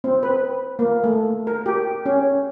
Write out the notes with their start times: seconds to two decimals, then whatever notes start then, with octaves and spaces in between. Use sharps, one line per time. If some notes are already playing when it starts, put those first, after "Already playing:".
0.04 C4
0.23 B4
0.79 A#3
1.04 A3
1.47 A#4
1.66 G4
2.06 C#4